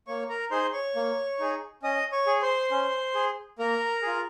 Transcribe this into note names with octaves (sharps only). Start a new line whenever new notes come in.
A#3 C#5 C#6
A#4 A#5
D#4 G#4 C5 C6
C#5 C#6
A#3
D#4 G#4
C#4 D#5 D#6
C#5 C#6
G#4
C5 C6
C#4
G#4
A#3 A#4 A#5
F4 G#4